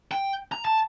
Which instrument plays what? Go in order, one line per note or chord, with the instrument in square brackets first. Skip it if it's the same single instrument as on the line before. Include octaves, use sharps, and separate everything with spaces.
[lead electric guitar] G5
A#5
A5